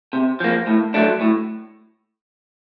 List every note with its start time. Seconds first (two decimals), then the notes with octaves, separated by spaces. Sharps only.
0.13 C3
0.40 F3 A#3
0.67 A2
0.94 F#3 A3 D4
1.21 A2